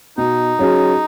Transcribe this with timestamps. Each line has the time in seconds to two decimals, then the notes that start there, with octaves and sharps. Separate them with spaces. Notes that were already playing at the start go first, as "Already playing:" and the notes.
0.17 B2 D#4
0.59 F#3 C#4 G#4